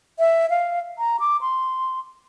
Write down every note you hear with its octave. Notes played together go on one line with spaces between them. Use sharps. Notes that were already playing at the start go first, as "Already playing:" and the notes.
E5
F5
A#5
D6
C6